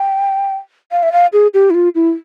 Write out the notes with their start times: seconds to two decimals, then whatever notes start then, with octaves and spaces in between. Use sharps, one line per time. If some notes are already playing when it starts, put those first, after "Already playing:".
Already playing: G5
0.91 F5
1.03 E5
1.12 F5
1.33 G#4
1.54 G4
1.70 E4
1.74 F4
1.95 E4